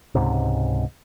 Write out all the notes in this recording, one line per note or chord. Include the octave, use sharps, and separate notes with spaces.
C#2 G#2 C3